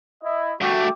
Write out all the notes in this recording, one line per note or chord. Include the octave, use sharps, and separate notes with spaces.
E4 D#5
G2 A3 F#4 E5 G5 D6